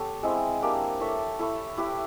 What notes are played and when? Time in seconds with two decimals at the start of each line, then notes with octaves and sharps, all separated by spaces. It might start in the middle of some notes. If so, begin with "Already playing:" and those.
Already playing: B3 G4 A4 C#5
0.23 G#3 C4 E4
0.62 A#3 D4 G4 A#4
1.00 E4 A4 C#5 E5
1.39 E4 A4 C#5
1.78 E4 G4 B4